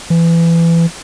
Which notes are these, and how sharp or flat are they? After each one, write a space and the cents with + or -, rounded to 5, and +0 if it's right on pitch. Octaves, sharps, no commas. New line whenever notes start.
E3 +25